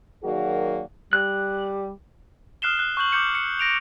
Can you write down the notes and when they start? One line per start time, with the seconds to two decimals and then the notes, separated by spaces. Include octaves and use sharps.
0.24 D#3 F#3 A#3 F#4 G#4 D5
1.13 G3 F#6
2.62 D#6 F6 F#6 C7 E7 G7
2.77 F#6 E7
2.97 C#6 F#6 G6 F#7
3.12 C#6 D6 G6 C#7
3.35 C#7
3.59 A#6 D7 F7